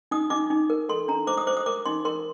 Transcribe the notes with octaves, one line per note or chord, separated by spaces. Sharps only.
D#4 D#6
D#4 D6
D#4
A#4
A4 C6
D4 A#5
C5 D6
D#6
C5 D6
D#6
A#4 D6
D#4 C6
A#4 C6